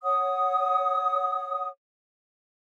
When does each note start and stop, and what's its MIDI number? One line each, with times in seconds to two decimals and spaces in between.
0.03 1.67 73
0.03 1.67 78
0.03 1.67 87